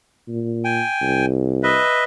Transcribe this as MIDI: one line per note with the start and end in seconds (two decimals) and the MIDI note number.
0.28 0.81 46
0.65 1.26 79
0.65 1.26 80
1.01 1.79 36
1.63 2.04 71
1.63 2.04 75
1.63 2.04 76